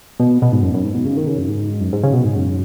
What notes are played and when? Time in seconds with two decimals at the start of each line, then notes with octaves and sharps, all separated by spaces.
0.19 B2
0.42 B2
0.52 G#2
0.62 F#2
0.74 F#2
0.84 G#2
0.94 B2
1.05 C#3
1.17 D#3
1.27 C#3
1.38 F#2
1.49 G#2
1.81 F#2
1.93 G#2
2.03 C#3
2.13 B2
2.24 G#2
2.36 F#2